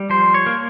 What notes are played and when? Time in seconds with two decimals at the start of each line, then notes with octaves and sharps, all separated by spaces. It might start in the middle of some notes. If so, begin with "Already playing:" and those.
Already playing: G3
0.10 F3 C5
0.34 C#5
0.46 A#3